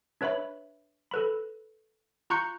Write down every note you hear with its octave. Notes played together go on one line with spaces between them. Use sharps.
D4 B4 C#5 E5 B5
A4 B4 B5
F4 A#5 C#6 F#6 G6 C#7